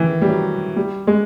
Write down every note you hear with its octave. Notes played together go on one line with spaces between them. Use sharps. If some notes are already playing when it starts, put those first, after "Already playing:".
Already playing: D#3 E3
G3
F#3
G3
G#3